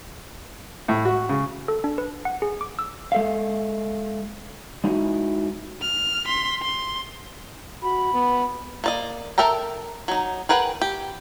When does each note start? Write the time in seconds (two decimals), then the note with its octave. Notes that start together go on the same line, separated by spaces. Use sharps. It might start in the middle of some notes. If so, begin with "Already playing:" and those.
0.88 A2
1.05 F#4
1.29 C#3
1.68 A4
1.84 D4
1.98 B4
2.25 F#5
2.42 G#4
2.61 D6
2.79 E6
3.12 G#3 A4 E5 F5
4.84 G#3 D#4 E4 F#4
5.81 F6
6.25 C6 B6
6.63 C6
7.83 F#4 B5
8.14 B3
8.84 A#3 D5 D#5
9.38 A4 A#4 E5 G5 A#5
10.08 F#3 D#4
10.49 G#4 A#4 B4 F#5 G5
10.82 G4